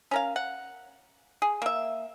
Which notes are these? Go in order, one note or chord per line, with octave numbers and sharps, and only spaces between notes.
C#4 A#4 F5
F#5
G#4
A#3 E5